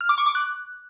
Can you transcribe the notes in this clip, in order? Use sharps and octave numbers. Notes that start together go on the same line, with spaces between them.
F6
D6
C#6
D6
F#6